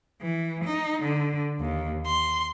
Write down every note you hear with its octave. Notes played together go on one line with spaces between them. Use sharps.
E3
D#4
D3
D#2
C6